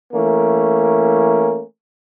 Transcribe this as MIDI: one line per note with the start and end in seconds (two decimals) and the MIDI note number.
0.14 1.62 52
0.14 1.62 57
0.14 1.62 58
0.14 1.62 61
0.14 1.62 70